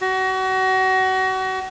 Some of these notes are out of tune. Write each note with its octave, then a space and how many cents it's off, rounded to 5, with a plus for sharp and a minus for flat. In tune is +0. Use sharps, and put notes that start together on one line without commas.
F#4 +30